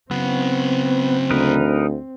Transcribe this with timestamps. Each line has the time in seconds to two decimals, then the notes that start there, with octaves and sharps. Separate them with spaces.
0.11 C#3 F#3 B3 C4
1.31 D2 D#4 A#4 B4